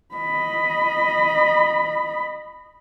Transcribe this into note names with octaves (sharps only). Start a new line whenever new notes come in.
D#5 B5